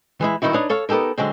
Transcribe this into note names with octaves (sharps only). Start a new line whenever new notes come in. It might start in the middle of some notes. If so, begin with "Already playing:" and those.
E3 G#3 E4
G2 C3 D#3 D#4 E4 F#4
D4 D#4 B4 C#5 D5
A4 C#5 F5
B3 D#4 G4 A4 A#4
D3 F#3 G#3 C4